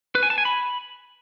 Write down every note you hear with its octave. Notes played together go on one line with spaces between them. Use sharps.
B4
G#5
A5
G#5
B5